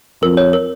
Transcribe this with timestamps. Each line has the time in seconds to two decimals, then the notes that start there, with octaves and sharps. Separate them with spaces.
0.22 F2 A#4
0.37 C#5
0.53 A#4